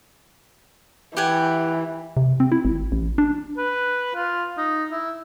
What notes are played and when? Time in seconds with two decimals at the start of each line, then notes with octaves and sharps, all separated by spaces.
1.17 E3 G4 F#5 G#5
2.17 C3
2.40 C4
2.52 E4
2.65 G#1
2.92 A1
3.18 D4
3.58 B4
4.15 F4
4.58 D#4
4.92 E4